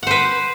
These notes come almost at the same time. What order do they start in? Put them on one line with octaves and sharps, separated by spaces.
F#5 C5 B4